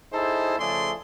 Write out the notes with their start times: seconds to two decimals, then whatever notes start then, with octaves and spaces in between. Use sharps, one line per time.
0.13 D#4 E4 G#4 A4 C5
0.59 C#3 F3 A3 G#4 D5 C6